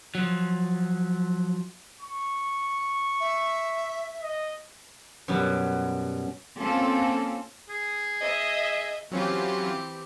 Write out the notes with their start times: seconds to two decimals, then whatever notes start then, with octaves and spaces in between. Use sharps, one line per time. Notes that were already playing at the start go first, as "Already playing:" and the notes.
0.15 F3 F#3
2.00 C#6
3.20 E5
4.22 D#5
5.28 F#2 B2 F#3 G3
6.59 A#3 C4 C#4 F4 A4
7.69 G#4
8.21 D#5 E5
9.12 E3 F#3 C4 C#4 F4 G4